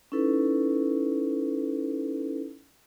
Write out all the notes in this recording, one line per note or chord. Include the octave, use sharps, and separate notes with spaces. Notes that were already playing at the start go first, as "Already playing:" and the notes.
C#4 D#4 E4 A4 B4